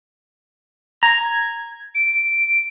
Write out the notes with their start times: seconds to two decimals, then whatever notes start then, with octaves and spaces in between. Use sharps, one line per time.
1.03 A#5 G#6
1.94 D7